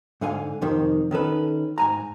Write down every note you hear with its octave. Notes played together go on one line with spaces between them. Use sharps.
G#2 D3 F5 G#5
F2 C3 D#3
D#3 C#4 A4 B4
G#2 G#5 A#5